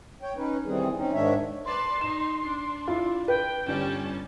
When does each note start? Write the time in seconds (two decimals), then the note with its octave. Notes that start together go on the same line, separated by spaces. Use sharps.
0.22 C#5 G5
0.37 C#4 D#4 B4
0.66 C3 D#3 E3 G3 C4 G#4
0.97 C4 C#4 D#4
1.13 G#2 D#3 G#3 D4 C#5 E5
1.65 B4 D5 A5 C6
2.01 D#4 E7
2.43 D4
2.88 E4 F4
3.28 B4 G5
3.68 G1 G3 C#4 A5